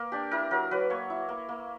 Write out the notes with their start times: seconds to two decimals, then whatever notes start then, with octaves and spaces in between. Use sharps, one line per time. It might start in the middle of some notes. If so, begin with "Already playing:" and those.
Already playing: A#3 A#4
0.12 D4 G4
0.31 E4 A#4
0.51 F#3 A#4
0.71 F#3 B4
0.90 A#3 C#5
1.10 E4
1.29 A#3
1.49 A#3